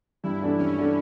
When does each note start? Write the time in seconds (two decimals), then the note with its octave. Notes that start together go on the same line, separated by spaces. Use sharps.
0.23 G2 E4
0.41 E3 A3 D4 F#4
0.59 G2 C#4
0.77 E3 A3 D4 F#4